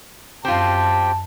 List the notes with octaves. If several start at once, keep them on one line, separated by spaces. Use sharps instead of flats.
F#2 C4 F4 G4 G5 A5